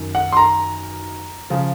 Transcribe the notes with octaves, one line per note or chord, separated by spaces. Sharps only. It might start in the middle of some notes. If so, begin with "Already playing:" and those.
Already playing: F#2 D#3
F#5
C6
A#5
C#3 F3